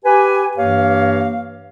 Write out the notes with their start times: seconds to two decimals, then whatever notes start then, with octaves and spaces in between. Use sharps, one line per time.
0.05 G4 B4 G#5
0.57 G2 E3 A#3 G4 C#5 F5